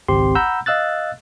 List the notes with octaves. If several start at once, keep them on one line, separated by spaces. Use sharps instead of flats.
G#1 C#2 C4 G4 C6
F#5 A#5 B5 E6 G6
D#5 F5 E6 F#6 A6